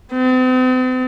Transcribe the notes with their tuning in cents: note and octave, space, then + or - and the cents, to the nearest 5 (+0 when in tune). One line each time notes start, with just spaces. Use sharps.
C4 -45